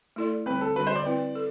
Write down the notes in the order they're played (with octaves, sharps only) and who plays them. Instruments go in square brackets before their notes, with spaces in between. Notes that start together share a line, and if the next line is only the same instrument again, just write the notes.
[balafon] A3 E4 A4 D5
[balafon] D3 G3 C4 [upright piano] B4
[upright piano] A4
[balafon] D3 G3 D4 F#4 [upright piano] B4
[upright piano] C5
D5
[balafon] C4 E4 B4
A4